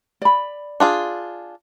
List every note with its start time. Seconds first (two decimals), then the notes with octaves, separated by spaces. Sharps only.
0.22 D5 B5
0.80 D4 F4 G#4